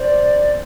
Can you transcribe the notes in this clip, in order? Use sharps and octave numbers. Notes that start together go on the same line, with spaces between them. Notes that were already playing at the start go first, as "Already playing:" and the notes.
Already playing: C5 D5